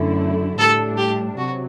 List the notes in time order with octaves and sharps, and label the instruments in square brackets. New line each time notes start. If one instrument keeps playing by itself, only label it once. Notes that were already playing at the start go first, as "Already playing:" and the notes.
Already playing: [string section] F#2 D3 A3 E4
[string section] A2 G3 D4 [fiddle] A4
[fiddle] G4
[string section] C3 F#3 [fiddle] F#4